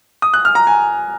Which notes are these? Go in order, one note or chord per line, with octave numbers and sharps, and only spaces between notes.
D#6
F#6
F6
A#5
G#5